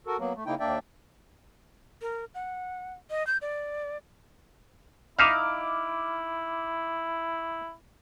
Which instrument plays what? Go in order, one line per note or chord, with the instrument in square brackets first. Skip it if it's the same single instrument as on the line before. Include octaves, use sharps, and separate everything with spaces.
[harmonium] F#4 A4 A#4
F#3 A#3 B3
A3
C#3 A#3 D#4 E4 G5
D#2 A#3 D4 D5 E5 G5
[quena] A#4
F#5
D#5
G6
D5
[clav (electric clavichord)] D#4 E5 F5 [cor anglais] E4 [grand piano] D6 F6